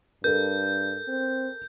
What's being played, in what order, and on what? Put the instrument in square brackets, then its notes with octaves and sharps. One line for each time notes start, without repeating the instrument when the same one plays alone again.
[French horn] G2 [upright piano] A4 A#4 [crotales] G6
[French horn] C4